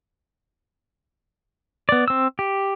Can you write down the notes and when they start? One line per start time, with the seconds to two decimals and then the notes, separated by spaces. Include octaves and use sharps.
1.89 B3 D5
2.08 C4 E6
2.39 G4